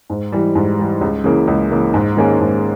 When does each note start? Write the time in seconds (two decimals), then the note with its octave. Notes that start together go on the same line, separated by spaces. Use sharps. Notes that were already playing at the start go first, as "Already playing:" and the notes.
0.10 G#2
0.32 E3 G3
0.55 G#2
0.79 E3 G3
1.01 C#2
1.24 C#3 E3 A#3
1.47 C#2
1.71 C#3 E3 A#3
1.94 G#2
2.17 D#3 A#3 C#4 G#4
2.40 G#2